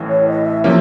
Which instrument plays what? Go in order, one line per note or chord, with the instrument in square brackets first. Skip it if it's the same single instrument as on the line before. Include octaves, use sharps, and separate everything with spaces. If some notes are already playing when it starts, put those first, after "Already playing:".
Already playing: [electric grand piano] A1 A2 E3
[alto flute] C#5
D#5
E5
[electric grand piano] C3 F3 A#3 C#4 [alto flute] E5